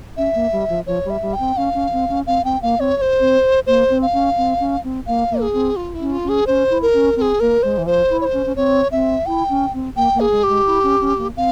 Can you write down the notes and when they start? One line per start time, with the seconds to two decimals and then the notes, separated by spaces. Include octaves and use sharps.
0.17 C#4 E5
0.35 A#3
0.52 G3
0.69 F3
0.87 F3 C#5
1.05 G3
1.10 E5
1.22 G3
1.33 G5
1.40 C4
1.57 C#4 F5
1.74 C#4
1.92 C4
2.09 C#4
2.27 C4 F5
2.44 C4 G5
2.62 A#3 F5
2.79 C4 C#5
2.97 C#5
3.01 C5
3.20 C4
3.67 A#3 C5
3.89 C4
4.02 F5
4.13 C#4
4.37 C4
4.60 C#4
4.84 C4
5.07 A#3 F5
5.31 A#3
5.41 G#4
5.53 C4
5.76 F4
5.94 E4
6.00 C#4
6.12 F4
6.24 C#4
6.29 G#4
6.47 C#4 C5
6.70 E4
6.82 A#4
6.93 C#4
7.16 C4 A#4
7.21 G#4
7.40 A#3 A#4
7.63 G#3 C5
7.78 E3
7.86 F3 C5
8.10 E4
8.21 C#5
8.25 C5
8.33 C#4
8.46 C#4
8.56 C4 C#5
8.91 C4 E5
9.26 E4 G5
9.49 C#4
9.74 C4
9.96 A#3 G5
10.14 A#3
10.20 G#4
10.31 G#3
10.43 G4
10.49 G#3
10.66 E4
10.83 C#4
11.01 C#4
11.18 A#3
11.36 C4 F5